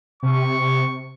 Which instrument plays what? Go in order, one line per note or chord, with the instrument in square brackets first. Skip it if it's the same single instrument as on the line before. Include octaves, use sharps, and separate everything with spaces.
[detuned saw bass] C3 [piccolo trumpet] C#6